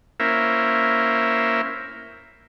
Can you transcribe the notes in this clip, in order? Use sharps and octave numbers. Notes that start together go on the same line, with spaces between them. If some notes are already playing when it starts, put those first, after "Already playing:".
A#3 C#4 E4 A#4 C5 E5